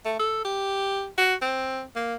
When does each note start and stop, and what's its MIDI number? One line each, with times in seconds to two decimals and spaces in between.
0.05 0.15 57
0.19 0.42 69
0.45 1.07 67
1.18 1.35 66
1.41 1.82 60
1.96 2.15 58